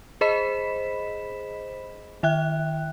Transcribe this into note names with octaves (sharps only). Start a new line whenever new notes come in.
G#4 C5 D#5 B5 B6 E7
D#3 E5 G5 F#6